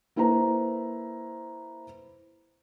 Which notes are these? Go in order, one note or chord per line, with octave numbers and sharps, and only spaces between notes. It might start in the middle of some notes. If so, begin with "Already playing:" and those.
A#3 E4 B4 C5 A#5